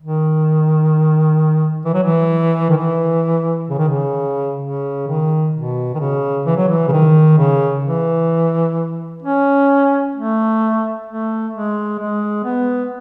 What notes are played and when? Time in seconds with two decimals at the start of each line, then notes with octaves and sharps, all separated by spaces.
0.01 D#3
1.85 E3
1.94 F#3
2.03 E3
2.70 D#3
2.77 E3
3.70 C#3
3.78 D#3
3.89 C#3
4.62 C#3
5.07 D#3
5.54 B2
5.94 D#3
5.99 C#3
6.46 E3
6.57 F#3
6.68 E3
6.88 C#3
6.92 D#3
7.38 C#3
7.85 E3
9.22 C#4
10.15 A3
11.06 A3
11.53 G#3
11.99 G#3
12.44 B3